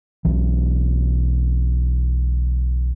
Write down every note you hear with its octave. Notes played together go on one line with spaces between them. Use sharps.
B1 E3